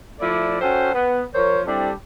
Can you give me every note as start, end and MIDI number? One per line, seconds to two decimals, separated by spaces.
0.20 0.59 53
0.20 0.59 57
0.20 0.59 64
0.20 0.59 74
0.61 0.91 61
0.61 0.91 66
0.61 0.91 69
0.61 0.91 72
0.61 0.91 78
0.61 0.91 79
0.94 1.23 59
1.35 1.62 53
1.35 1.62 70
1.35 1.62 72
1.35 1.62 73
1.66 1.91 55
1.66 1.91 60
1.66 1.91 62
1.66 1.91 64
1.66 1.91 67
1.66 1.91 69